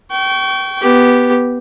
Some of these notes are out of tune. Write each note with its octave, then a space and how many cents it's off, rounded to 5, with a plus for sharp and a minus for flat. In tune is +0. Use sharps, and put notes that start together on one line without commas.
G5 -25 C#6 +15
B3 +0 G4 -5